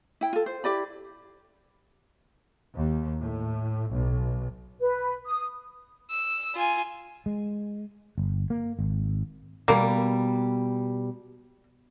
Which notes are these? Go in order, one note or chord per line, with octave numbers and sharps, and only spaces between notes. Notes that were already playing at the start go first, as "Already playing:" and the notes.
E4 G5
F4 A4
C5
E4 G4 D5 B5
D#2
A2
B1
B4
D#6
E6
F4 G#5
G#3
G1
A#3
G#1
B2 G3 A#3